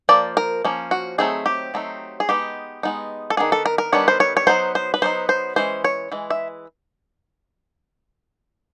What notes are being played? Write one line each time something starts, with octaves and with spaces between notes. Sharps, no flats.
F3 A#3 D5
A#4
F3 A#3 C#4
F#4
F#3 A3 C4 D#4 G#4
G4
F#3 A3 C4 D#4
G#4
G#3 B3 D#4 G4
G#3 B3 D#4
A4
D#3 G3 B3 D4 G#4
A4
A#4
A#4
D#3 G3 B3 D4 C#5
C5
C#5
C#5
F#3 B3 D#4 C5
C5
B4
F#3 B3 D#4 C5
C5
E3 G#3 C#4 C5
C#5
E3 G#3
E5